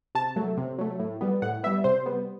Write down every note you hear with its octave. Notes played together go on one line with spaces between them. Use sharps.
C3 A5
F#3 A3
C3
F#3 A3
A2
G3 B3
A2 F#5
G3 B3 E5
C3 C5
G3 B3